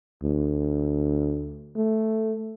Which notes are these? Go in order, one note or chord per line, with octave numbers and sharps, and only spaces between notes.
D2
A3